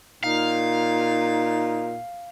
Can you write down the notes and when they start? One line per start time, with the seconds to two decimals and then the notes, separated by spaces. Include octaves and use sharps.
0.24 A#2 D#4 F5